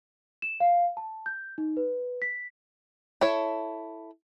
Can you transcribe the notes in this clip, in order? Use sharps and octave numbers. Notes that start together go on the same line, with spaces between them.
E7
F5
A5
G6
D#4
B4
B6
E4 A4 C#5